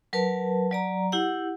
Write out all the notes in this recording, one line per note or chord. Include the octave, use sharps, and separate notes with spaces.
F#3 A#4 B4 A5
F#3 D5 A#5
E4 G4 F#5